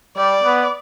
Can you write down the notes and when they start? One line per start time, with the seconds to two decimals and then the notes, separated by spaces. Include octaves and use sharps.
0.16 G3 D5
0.44 B3